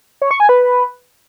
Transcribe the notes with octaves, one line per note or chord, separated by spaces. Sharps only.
C#5
C#6
G#5
B4